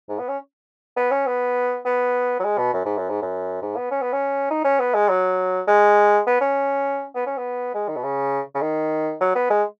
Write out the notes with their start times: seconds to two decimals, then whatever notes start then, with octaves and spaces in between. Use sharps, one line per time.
0.09 G#2
0.19 B3
0.29 C#4
0.97 B3
1.11 C#4
1.27 B3
1.85 B3
2.40 F#3
2.44 G#3
2.58 B2
2.73 F#2
2.85 G#2
2.98 F#2
3.10 G#2
3.22 F#2
3.62 G#2
3.77 B3
3.91 C#4
4.02 B3
4.13 C#4
4.50 D#4
4.64 C#4
4.79 B3
4.94 G#3
5.09 F#3
5.67 G#3
6.27 B3
6.41 C#4
7.15 B3
7.26 C#4
7.37 B3
7.74 G#3
7.88 D#3
7.96 B2
8.04 C#3
8.55 C#3
8.62 D#3
9.21 F#3
9.35 B3
9.50 G#3